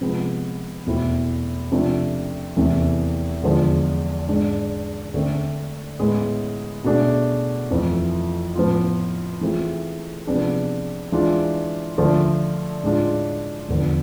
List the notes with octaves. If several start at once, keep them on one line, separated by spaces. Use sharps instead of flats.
C3 F3 G#3 B3
E2 B2 A3 C4 E4
C3 F3 A3 D4 F4
E2 C3 E3 A3
E2 D3 F3 G#3
G#2 G#3 D4 G#4
D3 A3 C4
A2 G#3 B3
B2 A3 D4 G#4
F2 E3 A3
A2 F3 B3 F4
E3 A3 C4 F4 G#4
C3 F3 B3 D4 G#4
E3 G#3 D4 F4
D3 F3 A3
A2 G#3 D4 F4
E2 D3 F3 B3